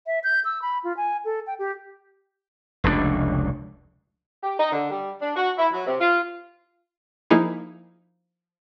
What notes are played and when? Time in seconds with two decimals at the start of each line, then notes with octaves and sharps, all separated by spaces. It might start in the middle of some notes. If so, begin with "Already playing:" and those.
0.07 E5
0.24 G6
0.45 E6
0.62 B5
0.84 F4
0.97 G#5
1.25 A4
1.47 G5
1.59 G4
2.84 F1 C#2 G#2 D4
4.43 G4
4.59 D#4
4.72 D3
4.90 G3
5.22 D4
5.36 F#4
5.58 E4
5.72 F#3
5.87 C3
6.00 F4
7.30 F3 A#3 D#4 E4 G#4